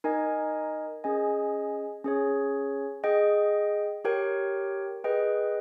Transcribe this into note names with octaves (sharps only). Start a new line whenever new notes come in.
D#4 A#4 D#5 G#5
C#4 G#4 D#5 G#5
C#4 G#4 C#5
G#4 D#5 G5
G4 A#4 C#5 G5
G#4 B4 D#5 G5